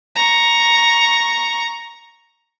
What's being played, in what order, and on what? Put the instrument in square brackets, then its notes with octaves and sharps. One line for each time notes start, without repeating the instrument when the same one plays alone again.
[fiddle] A#5 C#6